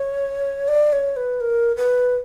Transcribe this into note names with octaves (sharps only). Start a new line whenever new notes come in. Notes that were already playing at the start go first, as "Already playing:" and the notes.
Already playing: C#5
D5
C#5
B4
A#4
B4